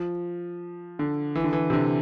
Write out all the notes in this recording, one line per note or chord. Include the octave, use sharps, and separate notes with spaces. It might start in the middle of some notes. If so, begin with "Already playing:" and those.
Already playing: F3
D3
E3
D3
E3
C3
D3